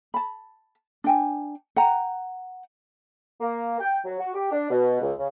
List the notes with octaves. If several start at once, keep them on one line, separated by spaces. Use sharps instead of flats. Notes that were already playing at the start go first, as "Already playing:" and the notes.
A5 B5
D4 G5 G#5
F#5 G5 A#5
A#3
G5
F#3
F#4
G4
D4
B2
C#2
C#3